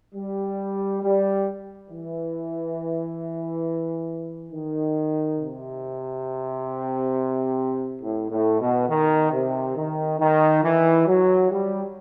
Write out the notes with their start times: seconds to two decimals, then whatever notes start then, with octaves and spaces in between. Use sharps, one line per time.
0.15 G3
1.03 G3
1.91 E3
4.52 D#3
5.39 C3
8.03 A2
8.31 A2
8.61 B2
8.89 D#3
9.32 C3
9.76 D#3
10.20 D#3
10.64 E3
11.07 F#3
11.51 G3